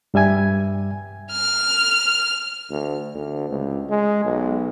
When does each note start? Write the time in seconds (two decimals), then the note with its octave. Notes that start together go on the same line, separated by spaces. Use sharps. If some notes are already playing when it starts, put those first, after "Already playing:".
0.14 G2 G3 E5 G#5 G#6
1.32 F6
2.70 D2
3.15 D2
3.49 C#2
3.90 G#3
4.25 B1